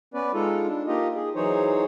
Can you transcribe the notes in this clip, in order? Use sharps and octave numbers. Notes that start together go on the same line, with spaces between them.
B3 C#4 B4 D5
G#3 D#4 F4 A4
D4
A#3 D#4 F4 G4 D#5
G#4
E3 F#3 D#4 G#4 C5 C#5